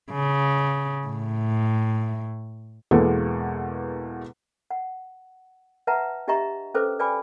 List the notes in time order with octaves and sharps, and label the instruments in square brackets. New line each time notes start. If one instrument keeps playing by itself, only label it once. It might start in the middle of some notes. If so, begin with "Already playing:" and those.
[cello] C#3
A2
[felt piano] E2 B2 G#3 A#3 A4
[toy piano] F#5
B4 E5 F#5 A5 A#5
D4 G4 D#5 E5 A#5 C#6
C#4 A4 B4 C5 D6
B4 D5 G5 G#5 B5 D6